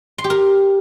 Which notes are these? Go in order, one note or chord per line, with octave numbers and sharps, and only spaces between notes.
C6
G4
A#4